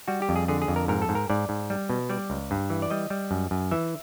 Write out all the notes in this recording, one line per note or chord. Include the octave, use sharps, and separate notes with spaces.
G3 F#4
G4
F2
G#4
D3 G#4
G#4
F2
A#4
G#2 A#4
A4
G#2
A#4
G#2 D5
G#2
G3
B2
G3 D5
C#2
G2
E3
D5
G3 D#5
G3
F#2
F#2
E3 E5